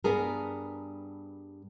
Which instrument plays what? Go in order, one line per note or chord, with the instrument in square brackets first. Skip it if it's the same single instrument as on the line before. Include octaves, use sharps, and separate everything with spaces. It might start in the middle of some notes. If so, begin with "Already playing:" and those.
[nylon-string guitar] G2 B3 D4 G#4 A#4